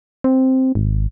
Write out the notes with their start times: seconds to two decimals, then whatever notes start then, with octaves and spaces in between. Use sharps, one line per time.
0.24 C4
0.75 G#1